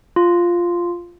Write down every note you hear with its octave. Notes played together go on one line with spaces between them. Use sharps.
F4